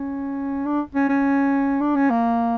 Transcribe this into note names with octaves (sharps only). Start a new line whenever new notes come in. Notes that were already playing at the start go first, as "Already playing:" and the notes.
Already playing: C#4
D4
C#4
C#4
D4
C#4
A#3